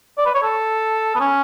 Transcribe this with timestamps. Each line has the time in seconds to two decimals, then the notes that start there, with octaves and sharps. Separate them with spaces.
0.17 D5
0.26 B4
0.34 C#5
0.43 A4
1.15 B3
1.20 C#4